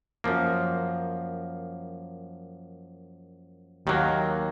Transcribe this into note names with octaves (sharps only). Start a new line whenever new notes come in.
F#2 F3 A#3
D#2 D#3 F#3 A#3